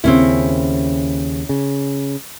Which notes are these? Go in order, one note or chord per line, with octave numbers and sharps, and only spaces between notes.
D#2 C#3 C4 C#4 E4
C#3